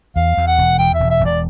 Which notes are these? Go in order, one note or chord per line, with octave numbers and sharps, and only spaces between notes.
E2 F5
E2
F#5
E1
E2 G5
E5
E1
E5
E1
D5